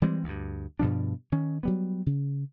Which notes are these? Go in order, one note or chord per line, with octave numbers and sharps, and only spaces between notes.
E3 G3 G#3 C4
D2 G2
G2 B2 F3 D4
D#3 C#4
F#3 G3 B3
C#3